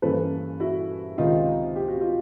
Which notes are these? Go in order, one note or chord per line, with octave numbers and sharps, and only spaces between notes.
G2 E3 G3 A#3 C#4 A4 B4
E4 F#4
C#2 C3 D#3 D#4 F4
G4
F#4
F4